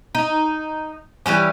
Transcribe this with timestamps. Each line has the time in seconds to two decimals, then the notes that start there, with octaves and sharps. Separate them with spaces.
0.15 D#4
1.26 E3 F#3 G3 C#4